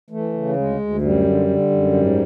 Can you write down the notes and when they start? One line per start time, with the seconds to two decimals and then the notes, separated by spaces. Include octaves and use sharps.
0.10 E3 A3
0.33 C#3
0.56 D2 G#3
0.79 D2
1.01 F#2 G3
1.24 D3
1.48 D3
1.70 F#2
1.93 G#2